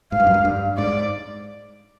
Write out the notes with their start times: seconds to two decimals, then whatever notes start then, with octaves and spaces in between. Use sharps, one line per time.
0.12 G#2 F5
0.20 G2
0.27 F#2
0.34 G2
0.45 G2
0.78 G#2 D5